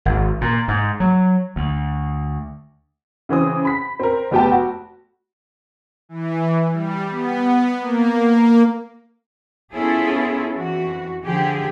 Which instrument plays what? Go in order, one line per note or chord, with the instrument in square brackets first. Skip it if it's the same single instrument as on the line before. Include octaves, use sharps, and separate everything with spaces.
[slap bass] G#1
A#2
G#2
F#3
D2
[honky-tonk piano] C#3 E3 C4 D#6
B5 B6
C4 A#4
F1 B3 G4 G5 A5
F#4
[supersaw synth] E3
G3
B3
A#3
[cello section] B3 C#4 E4 F4 G#4 A4
F2 E3 F#4
D3 F3 G4 G#4